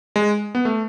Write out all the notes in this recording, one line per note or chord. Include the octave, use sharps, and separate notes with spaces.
G#3
B3
A3